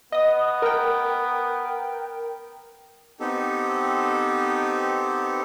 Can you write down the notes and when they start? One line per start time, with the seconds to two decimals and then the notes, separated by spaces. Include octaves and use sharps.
0.12 B3 D#5 D#6
0.62 A#4 G5
3.20 B3 C4 D#4 G4 A4